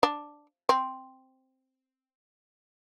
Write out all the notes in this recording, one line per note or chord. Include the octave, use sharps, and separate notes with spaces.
D4
C4